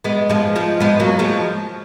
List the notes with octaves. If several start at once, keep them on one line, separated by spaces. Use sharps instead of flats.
G#3 B3
F3 G#3
F3 G#3
G#3 B3
F#3 A#3
F3 G#3